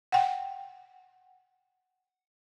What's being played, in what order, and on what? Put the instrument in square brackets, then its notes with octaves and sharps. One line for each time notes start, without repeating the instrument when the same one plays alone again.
[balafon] F#5 G5